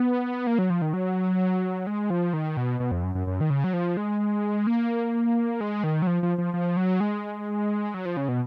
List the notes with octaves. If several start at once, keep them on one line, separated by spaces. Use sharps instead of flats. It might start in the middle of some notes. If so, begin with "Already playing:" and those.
Already playing: B3
A#3
F#3
F3
D#3
F#3
G#3
F3
D#3
B2
B2
F2
F#2
F#2
F#2
D#3
C#3
F#3
F3
G#3
A#3
G#3
D#3
F#3
F3
F3
F3
F3
F#3
G#3
F#3
F3
C#3
B2